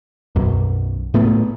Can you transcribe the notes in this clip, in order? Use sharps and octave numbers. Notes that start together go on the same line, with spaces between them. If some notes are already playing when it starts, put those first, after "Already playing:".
B1 F#2
A2 A3 B3